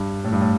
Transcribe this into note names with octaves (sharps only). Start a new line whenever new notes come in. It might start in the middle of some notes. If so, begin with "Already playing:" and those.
Already playing: G2
A2
G2
A2